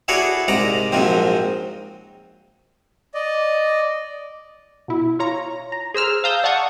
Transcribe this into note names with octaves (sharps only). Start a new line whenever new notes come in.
E4 F#4 G#4 A4 C#5 D5
C2 G#2 D5 A#5
A#1 G#2 F3 F#3 C4
D5 D#5
B2 E4
F4 C#5 A#5
A#5
G#4 C5 E6 F6
F5 A5 A#5 D#6 E6 G6
D5 F5 F#5 A5 C#6 D#6